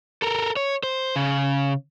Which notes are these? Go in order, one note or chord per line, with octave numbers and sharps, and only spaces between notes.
A4 A#4
C#5
C5
C#3